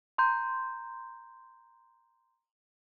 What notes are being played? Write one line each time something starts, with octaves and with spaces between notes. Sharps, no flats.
A#5 C6 G6